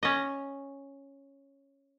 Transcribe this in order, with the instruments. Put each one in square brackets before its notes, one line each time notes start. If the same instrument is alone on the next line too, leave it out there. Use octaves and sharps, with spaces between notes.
[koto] C#4 D#5